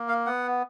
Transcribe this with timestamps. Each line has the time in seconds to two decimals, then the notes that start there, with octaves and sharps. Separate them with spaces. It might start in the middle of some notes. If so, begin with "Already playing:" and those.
Already playing: A#3
0.09 F5
0.26 B3 F#5